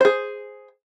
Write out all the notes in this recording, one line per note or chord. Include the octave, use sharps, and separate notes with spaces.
G#4 C5